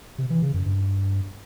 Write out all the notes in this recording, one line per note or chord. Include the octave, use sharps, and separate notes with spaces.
C3
E3
C#3
F#2
G2